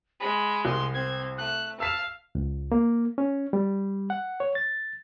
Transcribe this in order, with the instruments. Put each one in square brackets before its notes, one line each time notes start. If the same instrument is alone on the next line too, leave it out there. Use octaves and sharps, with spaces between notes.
[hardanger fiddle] G#3 [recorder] B5
[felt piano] C2 [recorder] C6
[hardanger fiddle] C4 [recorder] G#6
[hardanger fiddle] A3 [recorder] F#6
[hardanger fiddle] F5 [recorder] A5 [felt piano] E6 B6 E7
[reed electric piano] C#2
A#3
C#4
G3
F#5
C#5
A6